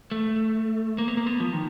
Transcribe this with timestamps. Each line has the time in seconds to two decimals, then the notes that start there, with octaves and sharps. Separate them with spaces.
0.11 A3
0.98 A#3
1.08 B3
1.17 A#3
1.27 B3
1.40 F3
1.53 D#3